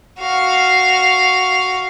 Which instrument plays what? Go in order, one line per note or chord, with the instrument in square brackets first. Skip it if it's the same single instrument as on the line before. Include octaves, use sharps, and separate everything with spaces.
[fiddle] F#4 F5